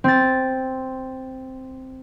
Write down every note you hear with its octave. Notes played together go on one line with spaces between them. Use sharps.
C4 A6